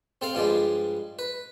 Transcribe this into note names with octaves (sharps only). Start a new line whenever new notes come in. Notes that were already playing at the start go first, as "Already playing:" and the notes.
C4 A4 F5
G2 F3 G3 G#3
B4